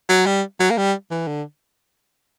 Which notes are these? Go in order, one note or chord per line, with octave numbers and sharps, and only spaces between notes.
F#3
G3
F#3
A#3
G3
E3
D3